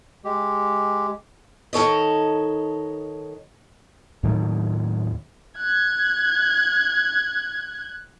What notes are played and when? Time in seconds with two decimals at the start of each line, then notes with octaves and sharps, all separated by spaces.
0.25 G#3 G4
1.73 D#3 A4 C#5 D#5
4.23 D#2 A2 D#3 F#3
5.58 F#6 G#6